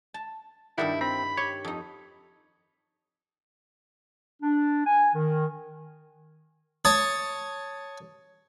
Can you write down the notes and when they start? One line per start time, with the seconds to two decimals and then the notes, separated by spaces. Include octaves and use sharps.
0.14 A5
0.78 G2 D#3 G3 A#3 E4 F#5
1.01 C4 B5
1.37 G4 C#5
1.65 F2 D#4
4.43 D4
4.86 G#5
5.15 D#3
6.85 C#5 A5 D#6